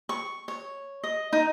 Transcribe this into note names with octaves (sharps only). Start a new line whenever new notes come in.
C#6
C#5
D#5
D#4